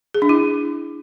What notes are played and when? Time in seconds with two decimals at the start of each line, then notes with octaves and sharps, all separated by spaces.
0.14 G#4
0.22 D4
0.29 E4